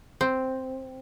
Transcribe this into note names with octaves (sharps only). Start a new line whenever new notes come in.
C4